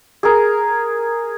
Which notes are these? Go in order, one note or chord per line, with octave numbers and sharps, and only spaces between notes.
G#4 A#4